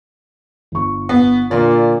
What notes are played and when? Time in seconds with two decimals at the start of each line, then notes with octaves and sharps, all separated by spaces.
0.72 G1 C#6
1.09 B3
1.51 A#2 D3 D5